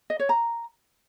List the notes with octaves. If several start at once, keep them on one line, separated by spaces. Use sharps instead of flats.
D#5
C#5
A#5